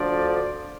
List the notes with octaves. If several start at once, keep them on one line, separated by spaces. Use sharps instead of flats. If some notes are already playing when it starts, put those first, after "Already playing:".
Already playing: D2 D3 F3 D5